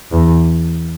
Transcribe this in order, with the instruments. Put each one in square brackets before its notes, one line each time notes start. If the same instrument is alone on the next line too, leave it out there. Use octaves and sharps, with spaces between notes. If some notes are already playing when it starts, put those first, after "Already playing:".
[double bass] E2